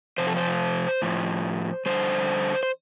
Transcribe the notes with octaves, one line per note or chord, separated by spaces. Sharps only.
F2 C3 F3 C5
A4
C5
A2 F3
F2 D3 G3 C5
C5